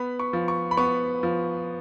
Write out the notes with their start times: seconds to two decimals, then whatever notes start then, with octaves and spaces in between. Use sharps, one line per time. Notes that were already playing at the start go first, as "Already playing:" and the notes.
Already playing: B3 B5
0.19 C#6
0.33 F3
0.48 C#6
0.71 B5
0.77 B3 C#6
1.23 F3